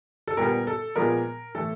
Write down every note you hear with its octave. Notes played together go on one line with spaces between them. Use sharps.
A4
A#2 G3 B3 A#4
A4
A#2 F3 G#3 B3 A#4
A2 E3 A3 A4